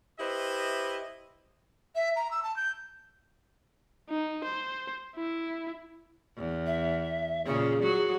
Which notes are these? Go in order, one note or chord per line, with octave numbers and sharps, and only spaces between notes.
E4 G4 B4 C5 D#5 E5
E5
A#5
E6
A5
G6
D#4
C5
E4
E2
E5
A#2 C#3 G#4
F#3 F#4